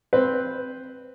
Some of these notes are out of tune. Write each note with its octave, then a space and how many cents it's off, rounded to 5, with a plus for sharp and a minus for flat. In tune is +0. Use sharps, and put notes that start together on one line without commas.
C4 +0 B4 +0